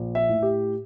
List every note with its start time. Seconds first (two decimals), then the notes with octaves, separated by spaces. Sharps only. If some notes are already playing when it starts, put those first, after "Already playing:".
Already playing: A#1
0.15 E5
0.29 A2
0.43 G4